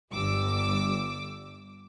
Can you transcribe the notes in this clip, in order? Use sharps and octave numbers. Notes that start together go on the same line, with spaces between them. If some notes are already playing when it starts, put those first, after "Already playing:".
G1 G2 D6 E6